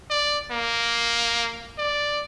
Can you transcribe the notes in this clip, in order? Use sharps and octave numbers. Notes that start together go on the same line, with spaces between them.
D5
A#3
D5